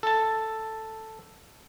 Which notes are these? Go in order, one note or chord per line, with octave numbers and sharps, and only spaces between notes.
A4 A5